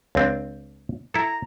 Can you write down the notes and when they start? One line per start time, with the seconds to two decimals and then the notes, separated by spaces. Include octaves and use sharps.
0.15 C#2 C4 D4
1.14 E4 A4 A#5